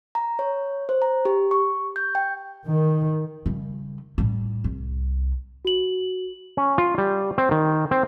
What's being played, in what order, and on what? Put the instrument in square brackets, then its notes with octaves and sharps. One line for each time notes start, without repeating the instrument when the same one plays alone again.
[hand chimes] A#5
C#5
C5
A#5
G4
C#6
G6
G5
[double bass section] D#3
[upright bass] C#3 G3
A2 G3
C2
[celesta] F#4 F#7
[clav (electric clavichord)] C#4
F4
G3
C4
D#3
C4